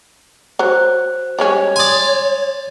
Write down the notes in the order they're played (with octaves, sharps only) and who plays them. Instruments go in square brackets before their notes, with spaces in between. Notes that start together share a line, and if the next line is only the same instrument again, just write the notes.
[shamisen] F#3 [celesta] F#4 C5 F#6
[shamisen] G3 G#3 C#4 [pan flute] C#5
[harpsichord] D5 G#5 [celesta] C6 D#6